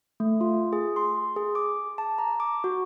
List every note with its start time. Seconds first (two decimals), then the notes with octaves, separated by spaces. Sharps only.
0.20 A3
0.41 F4
0.73 G#4
0.96 C6
1.36 G#4
1.55 D6
1.98 A5
2.18 A#5
2.40 D6
2.64 F#4